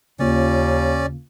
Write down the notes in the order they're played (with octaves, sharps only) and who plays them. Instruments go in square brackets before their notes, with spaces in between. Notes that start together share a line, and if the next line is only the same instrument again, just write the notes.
[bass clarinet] D#2 [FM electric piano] C#3 A#3 F4 [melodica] C#4 D5